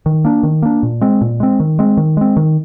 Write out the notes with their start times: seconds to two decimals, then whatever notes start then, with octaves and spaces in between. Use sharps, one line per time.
0.06 D#3
0.25 A#3 D4
0.43 D#3
0.62 A#3 D4
0.83 A#2
1.01 G#3 C4
1.21 A#2
1.40 G#3 C4
1.60 D#3
1.79 G#3 C4
1.97 D#3
2.17 G#3 C4
2.37 D#3